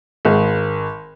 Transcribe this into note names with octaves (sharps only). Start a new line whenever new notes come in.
G#1